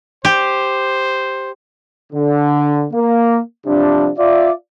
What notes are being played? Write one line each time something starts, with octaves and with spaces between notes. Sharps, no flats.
G4 C5
D3
A#3
C3 F3 G3 D4
F4 D5 E5